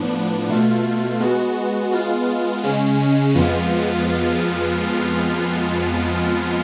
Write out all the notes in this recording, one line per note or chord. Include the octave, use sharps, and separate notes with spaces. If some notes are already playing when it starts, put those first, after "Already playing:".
Already playing: A2 F3 B3 D4
B2 A3 F4
G#3 B3 F#4
G#3 B3 F4
C#3 G#3 C#4
F2 F3 G#3 B3 F4